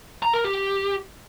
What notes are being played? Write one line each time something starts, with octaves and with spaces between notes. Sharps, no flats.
A#5
A#4
G4